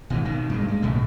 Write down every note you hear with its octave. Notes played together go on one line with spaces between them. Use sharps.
G#1 B2 E3
B2 D#3
G2 A#2 G#3
G#3
B1 A2 C#3 A3